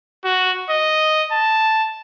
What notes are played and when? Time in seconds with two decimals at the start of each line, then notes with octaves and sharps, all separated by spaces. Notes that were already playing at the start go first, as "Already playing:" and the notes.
0.24 F#4
0.70 D#5
1.32 A5